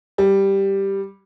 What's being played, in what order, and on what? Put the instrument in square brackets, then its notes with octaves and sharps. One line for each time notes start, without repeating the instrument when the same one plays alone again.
[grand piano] G3